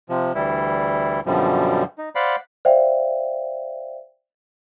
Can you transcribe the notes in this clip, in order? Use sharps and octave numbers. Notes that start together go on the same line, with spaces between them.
C3 F3
D2 E3 G3 E4
F#2 B2 D3 F3 G3
D#4
C5 D5 F5 F#5 B5
C5 D5 E5 F5 G5